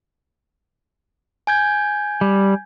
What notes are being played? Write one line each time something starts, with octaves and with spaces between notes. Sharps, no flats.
G#5 G6 G#6
G3